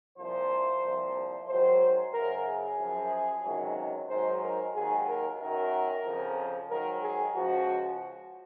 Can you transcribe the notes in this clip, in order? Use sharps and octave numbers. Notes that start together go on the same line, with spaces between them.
C2 A#2 F3 C5
C2 A#2 F3
G#2 D#3 F#3 C5
F#2 C#3 F#3 A#4
G#4
F#2 F3
C#2 C3 D#3 F#3
G#2 D#3 F#3 C5
A#4
D#2 D#3 F#3 G#4
A#4
F#2 D#3 F#3 A#4
F2 C#3 F3
G#2 D#3 F#3 A#4
G#4
C#2 C#3 F3 F#4